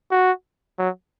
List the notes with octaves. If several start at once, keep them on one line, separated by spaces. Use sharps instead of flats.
F#4
F#3